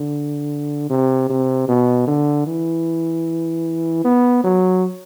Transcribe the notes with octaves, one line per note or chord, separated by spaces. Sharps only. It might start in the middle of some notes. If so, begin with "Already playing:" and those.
Already playing: D3
C3
C3
B2
D3
E3
B3
F#3